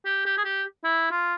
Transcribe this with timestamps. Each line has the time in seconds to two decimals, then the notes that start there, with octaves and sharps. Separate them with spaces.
0.05 G4
0.25 G4
0.37 G#4
0.45 G4
0.84 E4
1.11 F4